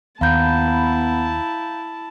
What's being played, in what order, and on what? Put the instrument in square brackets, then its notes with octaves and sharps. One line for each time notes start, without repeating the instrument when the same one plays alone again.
[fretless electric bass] D#2 [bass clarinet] B3 [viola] E4 A5 [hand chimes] F5 A#5 G6